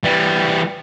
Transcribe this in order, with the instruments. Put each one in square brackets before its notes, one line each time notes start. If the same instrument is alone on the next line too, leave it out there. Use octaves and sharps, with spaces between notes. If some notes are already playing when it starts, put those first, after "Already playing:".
[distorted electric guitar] E3 G3